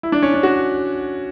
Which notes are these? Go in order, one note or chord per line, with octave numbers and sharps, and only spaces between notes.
E4
D4
C#4
D4
F#4